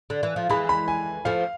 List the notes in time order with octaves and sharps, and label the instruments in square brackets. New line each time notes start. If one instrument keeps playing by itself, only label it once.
[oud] D3
E3
F3
[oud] E3 G#3 [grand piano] B5
[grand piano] B5
G#5
[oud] F3 A3 [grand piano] F5